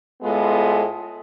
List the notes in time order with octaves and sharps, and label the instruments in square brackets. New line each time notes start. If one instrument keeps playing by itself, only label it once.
[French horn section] A2 G#3 B3 F4 A4